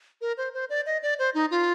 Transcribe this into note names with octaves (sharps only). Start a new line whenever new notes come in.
A#4
C5
C5
D5
D#5
D5
C5
D#4
F4